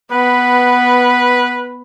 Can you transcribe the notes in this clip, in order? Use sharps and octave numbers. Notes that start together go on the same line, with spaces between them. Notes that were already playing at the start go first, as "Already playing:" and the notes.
B3 B4